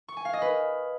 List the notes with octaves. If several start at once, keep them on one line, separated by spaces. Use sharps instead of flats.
C#6
G#5
F5
D#5
B4